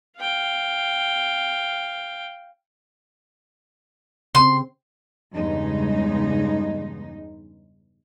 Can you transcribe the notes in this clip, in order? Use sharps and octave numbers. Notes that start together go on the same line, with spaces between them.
F5 G5
C#3 C4 C6
E2 G2 C#3 G#3 D#4